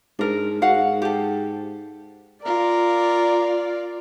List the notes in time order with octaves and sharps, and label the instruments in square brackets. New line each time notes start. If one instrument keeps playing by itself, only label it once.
[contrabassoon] G#2 [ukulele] D4 A#4
[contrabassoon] G#2 [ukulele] F#4 F5 F#5
[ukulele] G4 A4
[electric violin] F4 [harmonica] A#4 [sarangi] D5